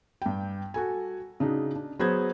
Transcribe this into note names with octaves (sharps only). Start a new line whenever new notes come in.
G2 G5
F#4 A4 G#5
C#3 D4 D#4 F#4
D4
F#3 B3 G#4 C5 G#6